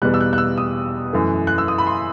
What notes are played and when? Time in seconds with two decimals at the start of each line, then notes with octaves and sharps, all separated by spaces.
0.02 E2 B2 G3 F#6
0.14 E6
0.21 F#6
0.33 F#6
0.38 E6
0.58 D#6
1.13 F#2 E3 A3
1.47 F#6
1.58 E6
1.68 D#6
1.78 B5
1.87 C6